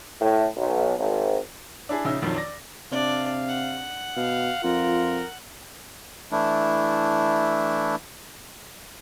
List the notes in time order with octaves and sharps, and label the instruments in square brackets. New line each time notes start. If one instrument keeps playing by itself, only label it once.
[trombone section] A2
B1
G#1
[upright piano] D4 E4 G#4
A#1 C#3 D#4 E5 E6
A#1 F2 D#3 F#3
D5 A#6
[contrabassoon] C3 [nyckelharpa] D4 D5 [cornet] F5
[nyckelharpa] F#5
[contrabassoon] B2 [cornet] F5
[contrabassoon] F2 [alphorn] F4 [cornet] A#4
[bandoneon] E3 A3 D4 E4